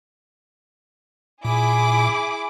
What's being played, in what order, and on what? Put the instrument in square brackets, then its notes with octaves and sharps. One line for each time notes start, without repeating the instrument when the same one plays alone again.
[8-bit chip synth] A#2 [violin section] E4 G#4 D6